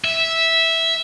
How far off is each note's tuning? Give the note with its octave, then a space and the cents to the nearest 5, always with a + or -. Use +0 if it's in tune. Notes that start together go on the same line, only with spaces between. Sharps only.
E5 -10